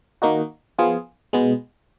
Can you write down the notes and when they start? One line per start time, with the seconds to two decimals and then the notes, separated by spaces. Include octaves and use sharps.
0.22 D#3 A#3 D#4 F#4
0.78 F3 B3 F4 G#4
1.33 B2 G#3 B3